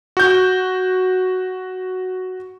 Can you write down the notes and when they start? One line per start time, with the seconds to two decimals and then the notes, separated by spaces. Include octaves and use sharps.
0.17 F#4 G6